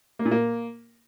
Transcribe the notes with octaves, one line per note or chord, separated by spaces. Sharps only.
A#3
A#2
A#3